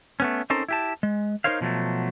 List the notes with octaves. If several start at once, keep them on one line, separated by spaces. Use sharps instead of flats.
A3 B3 C#4
C4 C#4 D#4 A4 A#4 C5
E4 G4 A5
G#3
D#4 F4 A#4 C5 C#5 F5
B2 F3 F#3 A3